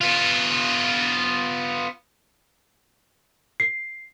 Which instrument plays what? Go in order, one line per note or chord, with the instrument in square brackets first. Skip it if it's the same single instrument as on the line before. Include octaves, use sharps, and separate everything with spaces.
[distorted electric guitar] B3 F4
[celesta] C7